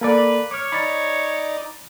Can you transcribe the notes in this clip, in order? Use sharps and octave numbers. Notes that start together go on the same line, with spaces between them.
A#3 A4 B4 D5
C#5 D6 F6
D#4 D5 B5 A6